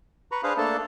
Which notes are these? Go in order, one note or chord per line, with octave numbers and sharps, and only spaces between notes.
B4 A#5 B5 C#6
D4 G#4 B4 C5 F5
A3 A#3 D4 A4 A5